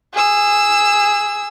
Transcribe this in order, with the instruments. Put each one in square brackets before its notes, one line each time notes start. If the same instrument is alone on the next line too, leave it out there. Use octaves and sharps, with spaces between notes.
[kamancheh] G#4 E6